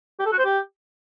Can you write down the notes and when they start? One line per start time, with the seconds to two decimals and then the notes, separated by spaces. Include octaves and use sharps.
0.20 G4
0.26 A4
0.32 F#4
0.39 C5
0.45 G4